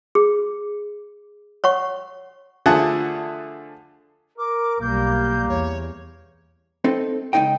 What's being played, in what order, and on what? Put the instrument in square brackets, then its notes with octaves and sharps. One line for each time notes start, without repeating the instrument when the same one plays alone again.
[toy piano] G#4
C#5 F#5 C#6
[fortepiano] D3 F3 A3 G#4 F#5 A5
[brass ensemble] A#4 [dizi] D6
[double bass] B1 G3 [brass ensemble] A#3 [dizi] G6
[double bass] E2 [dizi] C#5
[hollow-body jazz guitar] C4 D#4 A4
C#2 F#3 D#4 D#5 G5